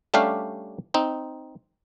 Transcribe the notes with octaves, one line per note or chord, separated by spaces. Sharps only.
G3 A3 C#4 D4 G4 F5
C4 D#4